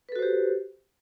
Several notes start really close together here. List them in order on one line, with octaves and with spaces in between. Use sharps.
B4 A4 F#4 C5 G4